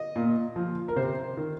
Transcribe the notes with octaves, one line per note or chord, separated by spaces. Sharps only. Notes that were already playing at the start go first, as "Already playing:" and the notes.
Already playing: D#5
A#2
F3
A#4
C3 C5
D#3